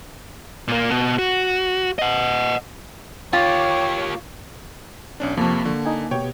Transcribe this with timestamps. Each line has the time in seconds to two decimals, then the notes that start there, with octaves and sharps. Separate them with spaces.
0.68 A#2 A#3
0.91 B2
1.19 F#4
1.99 D#5 F#5
3.33 A#3 F4 G4 C#5
5.20 B1 C#4 D4
5.37 F2 C3 F3 A#3 A5 C#6
5.65 D3
5.85 D#4 G#5
6.11 B2 B3 G4 C#5 G5